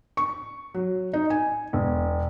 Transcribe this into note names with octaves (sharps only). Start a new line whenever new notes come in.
C#6
F#3
D#4
G#5
E1